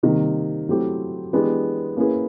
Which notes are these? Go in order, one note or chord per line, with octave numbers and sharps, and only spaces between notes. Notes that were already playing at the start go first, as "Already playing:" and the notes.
C3 D#3 G3 A#3
F#3 A3 C4 E4 G4
E3 G#3 B3 D4 G4
A#3 C#4 E4 G#4 B4